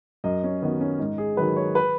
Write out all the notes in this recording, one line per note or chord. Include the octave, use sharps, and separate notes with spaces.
F#2 D#5
C#4
D#3 F#3 B3
C#4
G#2 D#4
G#4
D#3 F#3 B4
C#5
B4